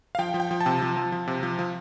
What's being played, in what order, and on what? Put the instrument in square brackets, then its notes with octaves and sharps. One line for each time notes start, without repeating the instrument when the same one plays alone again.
[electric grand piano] F5
F3 G5
F3
G5
F3
A5
C3
F3
F3
F3
C3
F3
F3